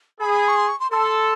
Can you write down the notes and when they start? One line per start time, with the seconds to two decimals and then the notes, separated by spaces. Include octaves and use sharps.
0.20 G#4 B5
0.48 C#6
0.56 C6
0.68 C#6
0.80 C6
0.91 A4 C6